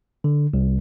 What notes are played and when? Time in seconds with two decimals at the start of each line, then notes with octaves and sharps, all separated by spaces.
0.24 D3
0.54 C2